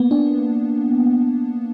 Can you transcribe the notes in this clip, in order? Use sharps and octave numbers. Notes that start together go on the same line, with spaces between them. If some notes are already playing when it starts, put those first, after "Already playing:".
Already playing: A#3 B3
D4